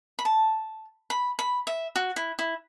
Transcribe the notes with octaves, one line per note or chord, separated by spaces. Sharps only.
B5
A5
B5
B5
E5
F#4
E4
E4